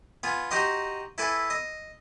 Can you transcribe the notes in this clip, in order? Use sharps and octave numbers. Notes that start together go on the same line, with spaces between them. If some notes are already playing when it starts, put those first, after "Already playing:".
B3 F4 G#5
D#4 F#4 G4 D#5 C6
E4 A4 B4 G#5 D6
D#5